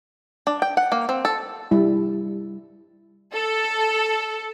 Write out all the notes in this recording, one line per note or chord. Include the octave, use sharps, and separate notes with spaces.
D4
G5
F#5
A#3
C4
A4
G3 E4
A4